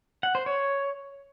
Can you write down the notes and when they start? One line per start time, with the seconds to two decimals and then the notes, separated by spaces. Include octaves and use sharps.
0.23 F#5
0.35 C5
0.46 C#5